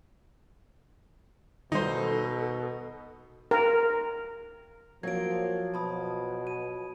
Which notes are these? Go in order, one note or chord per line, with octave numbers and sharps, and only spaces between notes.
B2 D#3 G3 D#4 A4 C5
A#4
F3 F#3 A#3 F4 G#6 D7
B2 A5 B5 D#6
D#7